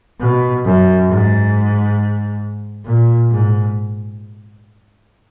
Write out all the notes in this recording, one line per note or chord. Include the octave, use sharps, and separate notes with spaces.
B2
F#2
G#2
A#2
G#2